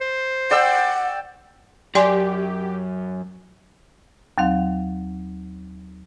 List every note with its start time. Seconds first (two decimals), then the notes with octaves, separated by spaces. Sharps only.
0.01 C5
0.51 D5 F#5 G5 E6
1.95 F#2 G4 D5 G#5 C6
4.38 D#2 F#3 C4 F5